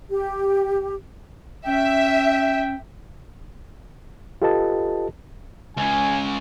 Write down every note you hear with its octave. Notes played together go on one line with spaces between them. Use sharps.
G4
C#4 E5 G5
F4 G4 A4 B4 D#5 A5
C#2 C#3 G#5